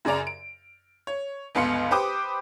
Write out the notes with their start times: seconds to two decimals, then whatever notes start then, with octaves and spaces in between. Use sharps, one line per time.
0.05 F#2 C#3 G#4 D5 A#5
0.27 D7
1.07 C#5
1.55 G1 C#2 B3 F5 C6 C#7
1.91 G4 B4 C5 G5 D6 D#6